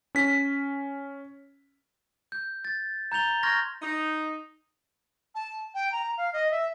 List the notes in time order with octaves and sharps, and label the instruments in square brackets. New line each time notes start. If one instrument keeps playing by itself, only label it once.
[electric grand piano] C#4 B6
[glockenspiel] G6
A6
A#5 G6 A6 F7 G7
C6 C#6 F6 G6 G#6 A#6
[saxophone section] D#4
[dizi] A5
G5
A#5
F5
D#5
E5